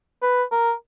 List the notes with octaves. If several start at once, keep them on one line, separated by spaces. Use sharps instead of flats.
B4
A#4